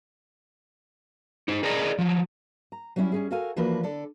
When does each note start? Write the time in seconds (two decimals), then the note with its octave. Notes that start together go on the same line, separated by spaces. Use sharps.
1.48 D#4 C5
1.63 G#4 A#4 D5 D#5 A#5
1.98 F3 F#3
2.72 A#5
2.96 F#3 G3 B3 C#4 E4 E5
3.12 G3 C#4 G#4
3.31 F#4 A4 A#4 F5 F#5 G#5
3.56 E3 F3 A#3 D4 F#4 B4
3.83 D3 A4 D5